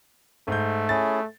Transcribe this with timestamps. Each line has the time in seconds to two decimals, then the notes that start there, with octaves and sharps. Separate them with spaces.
0.48 G#2 A3 G6
0.89 C#4 E4 G#4 A6